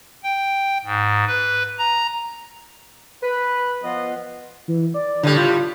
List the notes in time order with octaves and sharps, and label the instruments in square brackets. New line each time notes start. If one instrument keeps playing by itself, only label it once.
[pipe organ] G5
G#2
B4
A#5
[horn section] B4
F3 B3 F4 B4 D#5
[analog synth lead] E3
D5
[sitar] A2 G3 [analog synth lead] D3
[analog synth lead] F4